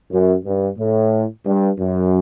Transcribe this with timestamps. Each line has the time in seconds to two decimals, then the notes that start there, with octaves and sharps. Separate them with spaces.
0.11 F#2
0.45 G2
0.78 A2
1.46 G2
1.79 F#2